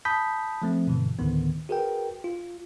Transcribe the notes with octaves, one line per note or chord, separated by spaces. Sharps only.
A5 B5 D#6 G6 B6
F3 A3 C4
G2 B2 D3 E3
D2 A2 D3 D#3 B3
F#4 G#4 A#4 B4 G5
F4